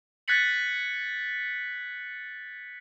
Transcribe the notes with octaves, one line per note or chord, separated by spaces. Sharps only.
F#6 G#6 A6 B6 C#7 F#7